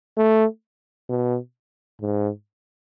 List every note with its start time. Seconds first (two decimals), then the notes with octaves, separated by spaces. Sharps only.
0.17 A3
1.09 B2
2.01 G#2